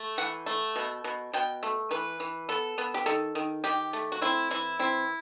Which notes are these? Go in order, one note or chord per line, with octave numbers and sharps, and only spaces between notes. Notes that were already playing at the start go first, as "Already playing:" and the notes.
Already playing: A3
E3 F#5
A3
B2
B2
B2 G5
A3
E3 B4
E3
B3 A4
B3
G4
D#3 A4
D#3
D#3 G4
A3
F#4
C4 E4
E3 E4
C4 E4